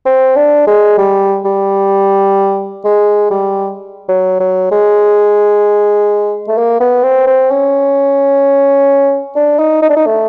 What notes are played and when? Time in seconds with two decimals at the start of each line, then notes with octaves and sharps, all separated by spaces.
0.06 C4
0.36 D4
0.67 G#3
0.98 G3
1.45 G3
2.84 G#3
3.31 G3
4.08 F#3
4.40 F#3
4.71 G#3
6.48 A3
6.57 A#3
6.80 B3
7.03 C4
7.27 C4
7.51 C#4
9.36 D4
9.59 D#4
9.82 D#4
9.89 D4
9.96 D#4
10.06 A3